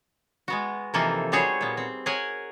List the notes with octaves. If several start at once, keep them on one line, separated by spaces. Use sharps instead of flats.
G#3 B3 F#4
C3 E3 F3 A#3 D#4 A4
G3 B3 F#4 G#4 C5 C#5
A#2 B3
C4
G#4 A#4 C#5 F#5 G#5